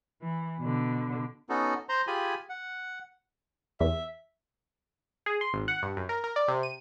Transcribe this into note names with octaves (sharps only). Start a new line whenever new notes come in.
E3
B2 D3
B3 C#4 D#4 F#4 A4
C5 A#5 C6
F4 G4 G#4 G#5 B5
F#5
E2 E5
G#4
C6
G#1
F#5
G2
F#2
A#4
A#4
D5
C3
D#7